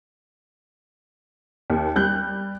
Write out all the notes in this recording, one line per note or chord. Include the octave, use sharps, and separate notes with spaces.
D#2
G3 F#6 G6